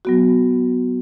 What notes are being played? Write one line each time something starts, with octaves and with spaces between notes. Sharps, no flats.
F#3 B3 F#4